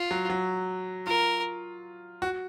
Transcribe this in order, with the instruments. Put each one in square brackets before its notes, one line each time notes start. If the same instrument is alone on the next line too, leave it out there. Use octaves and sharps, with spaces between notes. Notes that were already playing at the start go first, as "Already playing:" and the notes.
Already playing: [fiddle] F4
[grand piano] F#3
F#3
[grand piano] F4 [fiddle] A#4
[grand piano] F#4